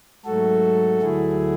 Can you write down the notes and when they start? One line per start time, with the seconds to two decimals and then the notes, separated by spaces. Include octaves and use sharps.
0.25 G#2 F#3 A3 F#4 A4
1.02 D2 D3 F#3 A3 E4 G#4